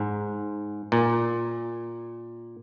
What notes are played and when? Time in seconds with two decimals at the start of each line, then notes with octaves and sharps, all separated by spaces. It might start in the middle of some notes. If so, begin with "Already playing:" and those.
Already playing: G#2
0.92 A#2